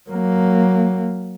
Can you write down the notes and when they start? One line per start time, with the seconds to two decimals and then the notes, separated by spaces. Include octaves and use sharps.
0.10 F#3 A#3